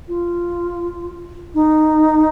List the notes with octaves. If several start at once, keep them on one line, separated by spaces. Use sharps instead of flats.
F4
D#4